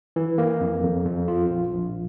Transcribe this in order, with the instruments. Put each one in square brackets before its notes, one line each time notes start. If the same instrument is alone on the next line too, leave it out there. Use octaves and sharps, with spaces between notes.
[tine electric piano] E3
A#3
F2
F2
F2
F4
A#1
A#1